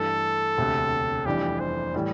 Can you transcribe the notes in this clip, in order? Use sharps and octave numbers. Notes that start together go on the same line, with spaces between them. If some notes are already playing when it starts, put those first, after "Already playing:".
Already playing: G2 E3 A3 A4
E1 D2 C3
F1 F2 E3 G3 D4 G4
C5
A2 E3 G3